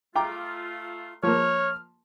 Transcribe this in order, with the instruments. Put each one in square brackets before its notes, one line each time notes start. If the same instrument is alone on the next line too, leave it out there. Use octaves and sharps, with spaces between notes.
[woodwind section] A3 F4 [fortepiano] G5 A#5 D6
[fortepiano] F3 A#3 [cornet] C#5 [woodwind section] F6